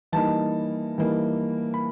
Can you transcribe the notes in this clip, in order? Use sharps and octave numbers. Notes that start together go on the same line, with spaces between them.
E3 G3 A#3 D#4 A5
E3 G3 A#3 D#4
B5